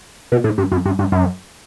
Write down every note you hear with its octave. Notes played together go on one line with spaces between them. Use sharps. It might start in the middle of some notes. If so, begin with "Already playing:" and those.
B2
A2
G2
F#2
G2
G2
F#2